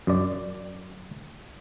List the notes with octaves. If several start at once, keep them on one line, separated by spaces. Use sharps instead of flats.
F#2 D5